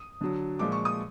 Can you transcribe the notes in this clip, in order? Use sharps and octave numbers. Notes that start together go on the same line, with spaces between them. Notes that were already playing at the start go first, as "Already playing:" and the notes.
Already playing: D#6
D3 F#3
A#2 F3 G#3 D6
C#6
D#6